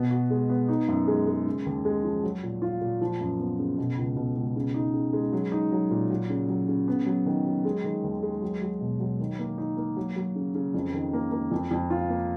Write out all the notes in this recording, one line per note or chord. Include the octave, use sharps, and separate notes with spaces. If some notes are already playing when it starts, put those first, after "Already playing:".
Already playing: B2 B3
F#4
G#3
B3
D#4
F#2
G#3
G#3
C#3
D#2
G#3
F3
F#3
A#2
F4
A#2
F3
F#2
B3
C#3
B2
C#2
B2
C#2
C#3
D#4
C#3
G#3
F#3
D#4
F#3
A#2
F#3
C#3
F#3
C#3
B3
F#3
D#3
F#3
G#3
D#3
D#2
G#3
F#3
F#3
B2
F#3
D#3
A#3
D#4
A#3
F#3
F#3
C#3
C#3
F2
D#3
A#3
A#3
F2
F2
F4
A#3